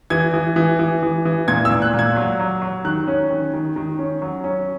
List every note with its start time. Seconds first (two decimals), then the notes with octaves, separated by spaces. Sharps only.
0.10 E3 G#6
0.33 E3
0.56 E3
0.79 E3
1.03 E3
1.25 E3
1.48 A#2 G#6
1.65 E6
1.71 A#2
1.82 F#6
1.94 A#2 G#6
2.16 F#3
2.40 F#3
2.62 F#3
2.85 D#3 F#6
3.07 C#4
3.30 D#3
3.53 D#3
3.76 D#3
3.99 C#4
4.22 F#3
4.44 C#4